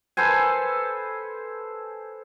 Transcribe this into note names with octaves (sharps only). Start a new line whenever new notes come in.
A4 B4 C5 G#5